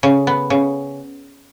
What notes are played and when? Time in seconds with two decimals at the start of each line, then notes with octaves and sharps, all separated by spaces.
0.03 C#3
0.27 B3
0.50 C#3